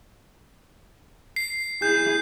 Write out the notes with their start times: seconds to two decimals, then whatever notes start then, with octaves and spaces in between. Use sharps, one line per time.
1.36 C7
1.82 E4 G#4 G6